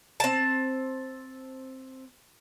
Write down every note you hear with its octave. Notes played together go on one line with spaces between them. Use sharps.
C4 A5